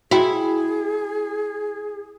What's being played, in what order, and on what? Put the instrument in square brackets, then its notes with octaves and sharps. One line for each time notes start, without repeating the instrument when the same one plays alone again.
[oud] E4 [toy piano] F#4 G5 [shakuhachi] G#4